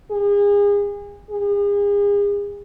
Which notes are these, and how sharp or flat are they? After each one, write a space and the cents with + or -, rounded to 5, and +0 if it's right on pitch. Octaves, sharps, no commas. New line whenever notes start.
G#4 -35
G#4 -40